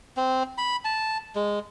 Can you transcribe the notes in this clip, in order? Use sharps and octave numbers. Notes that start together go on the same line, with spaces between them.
C4
B5
A5
G#3